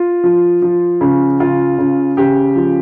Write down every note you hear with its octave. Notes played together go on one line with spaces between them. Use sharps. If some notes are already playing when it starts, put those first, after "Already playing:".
Already playing: F4
F3
F3
C#3
C#3 F4
C#3
C#3 G4
F3